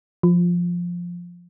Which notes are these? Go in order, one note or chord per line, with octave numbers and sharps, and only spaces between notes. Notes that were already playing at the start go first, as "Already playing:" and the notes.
F3